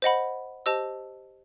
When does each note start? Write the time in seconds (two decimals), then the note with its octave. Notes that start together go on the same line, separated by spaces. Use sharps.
0.02 C5 D#5 F#5 B5
0.66 G4 C5 D#5 A5 E6